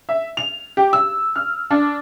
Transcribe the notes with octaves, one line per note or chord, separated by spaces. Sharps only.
E5
F7
G4
E6
F6
D4